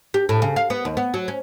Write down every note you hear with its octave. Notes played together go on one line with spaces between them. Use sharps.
G4
A2
C#3
F5
B3
D#2
B3
F#3
C#4